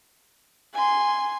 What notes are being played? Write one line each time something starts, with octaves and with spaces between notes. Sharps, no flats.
G#5 C6